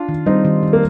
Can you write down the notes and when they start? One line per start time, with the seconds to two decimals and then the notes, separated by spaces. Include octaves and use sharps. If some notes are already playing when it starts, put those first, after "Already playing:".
Already playing: D4 F4
0.09 D#3
0.26 G3 C4 D#4
0.45 D#3
0.63 D#3
0.73 A#3